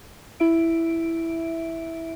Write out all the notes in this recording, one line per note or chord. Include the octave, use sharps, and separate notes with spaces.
E4 E5 D7